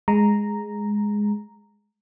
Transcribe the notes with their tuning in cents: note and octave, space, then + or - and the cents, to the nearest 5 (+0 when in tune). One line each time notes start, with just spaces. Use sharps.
G#3 +0 A#5 +0